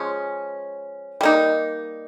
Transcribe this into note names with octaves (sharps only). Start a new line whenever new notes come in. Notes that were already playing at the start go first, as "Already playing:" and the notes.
Already playing: F3 G#3 C#4
G3 A#3 D#4